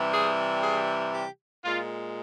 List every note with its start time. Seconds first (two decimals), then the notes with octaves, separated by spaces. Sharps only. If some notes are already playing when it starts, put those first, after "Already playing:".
Already playing: C3 E3 G3
0.13 G#4
0.63 G#4
1.14 G4
1.64 A#2 G#3 F4